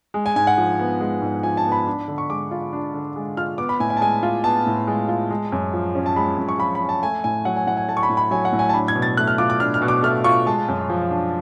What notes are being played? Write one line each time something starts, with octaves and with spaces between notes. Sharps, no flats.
G#3
G#5
G#2 G#5
F#5
F3
B3
G#3
G#2
F3 G#5
A5
B3
B5
D4
D3
C#6
G#3 D6
F4
D4
D3
G#3
F4 F6
B3 D6
B5
A2 G#5
G#5
A5
G#3 G#5
F4
B3 A5
A2
G#3
F4
G#3
F#2
F3
C#4
A5
G#3 B5
F#2
C#6
F3 B5
B5
C#4
A5
A3 G#5
A2 G#5
F#3 F#5
G#5
A2 F#5
G#5
A3 A5
C#6
B5
A2
B5
F#3 G#5
F#5
A2
G#5
A5
D4 B5
G#6
B2
A6
A3 F#6
F6
F4 D6
D6
D4 F6
F6
B2
D6
A3 F6
F4 C#6
G#3 A5
F#2
F3
D4